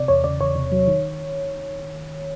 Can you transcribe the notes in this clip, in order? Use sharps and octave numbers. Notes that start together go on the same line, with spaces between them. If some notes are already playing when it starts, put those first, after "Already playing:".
Already playing: C3 D5
E2 C#5
C#3 D5
E2 C#5
C3
F#3
D#3